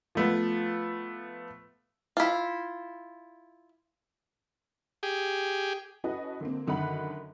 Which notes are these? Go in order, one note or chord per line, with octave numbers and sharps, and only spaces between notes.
F3 A3 B3
E4 F4
G4 G#4
C#4 E4 F#4 A4 B4 D#5
D3 A#3 C4
F#2 D3 D#3 F#5 B5 F#6